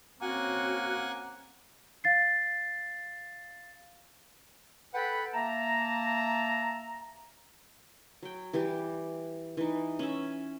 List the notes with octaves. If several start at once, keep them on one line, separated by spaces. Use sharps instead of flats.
A#3 C4 C#4 F#4 F#5 G#5
F5 A6 C7
A4 B4 F#5 G5 B5
A#3 E5 A5 A#5
F#3 G5
E3 G3 G4
E3 D#4
C#4 E5